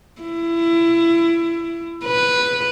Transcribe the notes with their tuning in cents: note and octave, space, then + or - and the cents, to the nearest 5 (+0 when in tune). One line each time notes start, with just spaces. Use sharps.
E4 +25
B4 -5